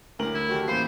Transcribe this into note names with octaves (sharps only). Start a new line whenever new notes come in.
D2 A2 G3 A#4 F#7
E4
D#3 F#3 C#4 F#4 G4 A4
A1 E3 G3 A#3 C5 B5 C7